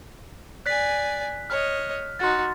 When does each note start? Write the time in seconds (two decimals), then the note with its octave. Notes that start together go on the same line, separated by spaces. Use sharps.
0.66 D5 G#5 F#6 B6
1.50 C#5 D#5 F6
2.19 D#4 F#4 C6 A6